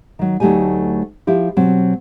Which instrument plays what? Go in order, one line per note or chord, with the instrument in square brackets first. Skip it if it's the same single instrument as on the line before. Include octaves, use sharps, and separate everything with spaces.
[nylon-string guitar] D#3 F#3
D2 F#3 A3 D#4 G4 G#5
F3 E4 G4
B2 F#3 C4